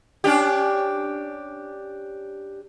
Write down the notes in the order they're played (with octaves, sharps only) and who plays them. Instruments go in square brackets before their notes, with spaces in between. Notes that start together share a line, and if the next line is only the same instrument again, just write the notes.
[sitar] C#4 D4 G4